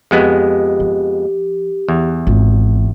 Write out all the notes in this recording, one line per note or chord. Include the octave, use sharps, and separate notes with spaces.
F2 G#3 B3 G4
F3
E2
G#1 F4